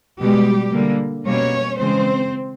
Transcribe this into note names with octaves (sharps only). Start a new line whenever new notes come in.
B2 G3 G#3 G4
D3 G3 A#3
B2 G3 A#3 C#4 C#5
C#3 E3 G#3 C4 C5